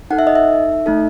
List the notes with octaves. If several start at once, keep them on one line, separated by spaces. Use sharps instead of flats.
D#4 A4 F#5
E5
D#5
E5
A3 D#4 A4